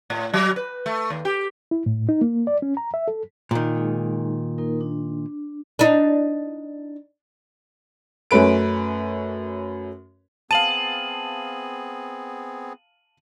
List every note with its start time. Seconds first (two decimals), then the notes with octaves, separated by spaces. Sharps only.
0.10 A2
0.34 F#3
0.56 B4
0.86 A3
1.10 D#2
1.25 G4
1.71 E4
1.86 A2
2.09 D#4
2.21 A#3
2.47 D5
2.62 C#4
2.77 A#5
2.94 E5
3.08 A4
3.51 A#2 D#3 D#4
3.75 G#3 D#4 G#4
4.58 A#3 D#4 A#4
4.81 D4
5.79 D4 D#4
8.31 F#2 A3 C#4 B4 D7
10.51 B3 C4 G#4 F5 A5 D#7 F#7